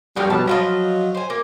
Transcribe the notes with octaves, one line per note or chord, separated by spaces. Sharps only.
A#1 G3 B3 D#4 F#4 G5 F6
B2 F#3 G3 A5
F3 F#3 F4 D#5 A5 B5
C5 G#5
A#3